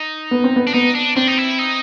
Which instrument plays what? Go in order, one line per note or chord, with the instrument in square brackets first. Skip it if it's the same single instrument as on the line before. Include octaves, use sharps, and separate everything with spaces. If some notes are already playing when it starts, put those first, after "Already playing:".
Already playing: [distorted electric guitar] D#4
[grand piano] B3
C4
B3
[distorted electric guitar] D4
[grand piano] B3 [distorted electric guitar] D#4
[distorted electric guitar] D4
[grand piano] C4 [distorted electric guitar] D4
[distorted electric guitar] D#4
E4
D#4